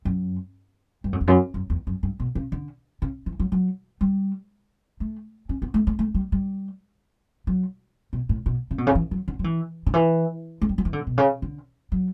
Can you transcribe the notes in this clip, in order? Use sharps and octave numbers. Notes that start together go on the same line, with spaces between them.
F#2
G2
F#2
E2
F#2
F#2
E2
F#2
G2
B2
C#3
D3
C#3
E3
F#3
F#3
G3
A3
C#4
B3
A3
A3
A3
G3
G3
F#3
B2
A2
B2
C#3
B2
C#3
E3
F#3
D3
F#3
E3
D3
E3
A3
G3
F#3
E3
D3
B2
C#3
D3
F#3